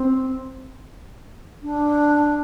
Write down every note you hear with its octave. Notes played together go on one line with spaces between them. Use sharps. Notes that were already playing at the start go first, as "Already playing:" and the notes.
Already playing: C4
D4